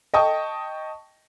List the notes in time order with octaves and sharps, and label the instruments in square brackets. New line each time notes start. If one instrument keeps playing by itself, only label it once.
[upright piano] D#5 G5 A5 C#6 D#6